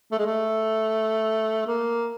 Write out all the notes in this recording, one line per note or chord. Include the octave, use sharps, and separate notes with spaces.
A3
G#3
A3
A#3